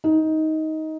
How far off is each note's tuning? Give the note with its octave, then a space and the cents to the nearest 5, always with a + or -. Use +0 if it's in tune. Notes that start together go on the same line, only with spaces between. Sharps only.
D#4 +15